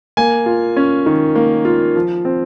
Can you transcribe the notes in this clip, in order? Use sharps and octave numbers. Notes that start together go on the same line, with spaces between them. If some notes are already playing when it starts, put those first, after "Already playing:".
A#3 G#5
F4
C#4
D#3
A#3
F4
F3
C4